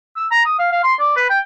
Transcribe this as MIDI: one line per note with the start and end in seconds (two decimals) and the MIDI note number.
0.16 0.26 88
0.31 0.41 82
0.46 0.58 87
0.59 0.67 77
0.72 0.82 77
0.83 0.94 84
1.00 1.14 74
1.16 1.27 71
1.30 1.39 79